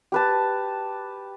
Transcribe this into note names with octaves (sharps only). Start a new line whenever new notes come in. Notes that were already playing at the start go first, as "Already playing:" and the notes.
G4 B4 A5